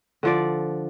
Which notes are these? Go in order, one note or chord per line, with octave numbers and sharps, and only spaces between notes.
D3 F3 D5